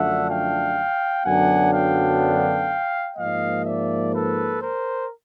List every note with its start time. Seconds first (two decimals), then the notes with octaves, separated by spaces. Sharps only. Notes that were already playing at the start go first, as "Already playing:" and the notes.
Already playing: F#2 D3 F3 A3 D4 E5 F#5
0.28 F5 G5
1.24 F#2 D3 F#3 B3 D4 F#5 G#5
1.72 F5 G5
3.17 G#2 F3 A#3 D#5 F5
3.66 D5 E5
4.14 A4 B4
4.62 A#4 C5